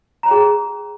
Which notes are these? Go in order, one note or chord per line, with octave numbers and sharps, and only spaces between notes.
G#4 C#5 G5 A#5